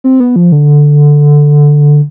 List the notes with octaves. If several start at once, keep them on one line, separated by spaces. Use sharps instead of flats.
C4
B3
F3
D3